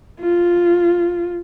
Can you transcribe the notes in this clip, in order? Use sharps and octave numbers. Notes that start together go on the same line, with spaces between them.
F4